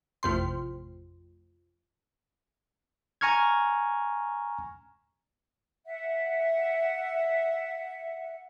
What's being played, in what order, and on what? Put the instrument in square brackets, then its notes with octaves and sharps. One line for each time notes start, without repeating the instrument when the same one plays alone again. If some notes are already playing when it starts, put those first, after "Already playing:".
[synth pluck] A1 F2 C3 C6
[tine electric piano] G#5 A#5 C#6 F6 G#6
[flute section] E5 F#5